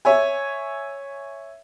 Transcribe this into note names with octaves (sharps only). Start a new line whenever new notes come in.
C#5 E5 G#5